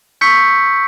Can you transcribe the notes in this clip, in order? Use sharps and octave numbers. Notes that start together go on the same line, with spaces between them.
C#6 E6 G6 B6 C#7